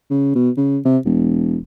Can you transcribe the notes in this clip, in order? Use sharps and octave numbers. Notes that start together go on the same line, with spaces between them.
C#3
B2
C#3
C3
E1